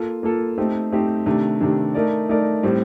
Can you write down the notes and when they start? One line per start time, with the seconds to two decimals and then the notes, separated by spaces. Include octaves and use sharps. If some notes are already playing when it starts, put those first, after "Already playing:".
Already playing: A#3 F4 A4
0.23 A#3 F4 A4
0.58 A3 C4 D#4 G4 C5
0.92 A3 C4 D#4 G4 C5
1.26 C3 D#3 A3 D4
1.60 C3 D#3 A3 D4
1.94 A3 D#4 A#4 D5
2.29 A3 D#4 A#4 D5
2.63 A2 G3 C4